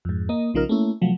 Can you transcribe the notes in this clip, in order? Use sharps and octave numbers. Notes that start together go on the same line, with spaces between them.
F2 G#2
A#3 D#5
B1 C#3 F3 D#4 A#4 F6
A3 A#3 C#4 E4
C3 F3 F#3 A3